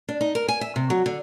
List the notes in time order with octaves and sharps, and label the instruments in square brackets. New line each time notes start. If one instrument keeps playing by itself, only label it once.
[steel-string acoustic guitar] D4
D#4
A#4
G#5
E5
C3
F#3
D3